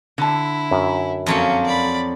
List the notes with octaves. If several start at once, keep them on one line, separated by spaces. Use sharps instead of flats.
D3 E4 A5
F#2
F2 F#3 A#3 C#4
D5 B5